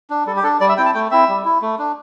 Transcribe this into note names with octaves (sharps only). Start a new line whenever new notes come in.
D4
G3 A4
G4
D4 A4
G3 D5
E5
C4 E4 G5
A5
A3 G5
C4 E4 E5
G3
E4
A3
D4